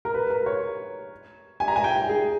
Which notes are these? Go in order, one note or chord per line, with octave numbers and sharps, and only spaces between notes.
A#4
B4
A#4
C#5
G#5
A#5
G#5
G5
G#4